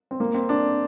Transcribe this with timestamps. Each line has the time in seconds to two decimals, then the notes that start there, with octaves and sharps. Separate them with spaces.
0.11 C4
0.20 A#3
0.34 C4
0.49 D4